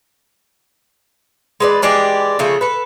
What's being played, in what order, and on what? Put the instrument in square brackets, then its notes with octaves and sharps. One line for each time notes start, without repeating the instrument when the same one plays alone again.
[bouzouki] G#3 B4 D5
E3 G#3 D4 G4
C#3 F3 A3
A4 B4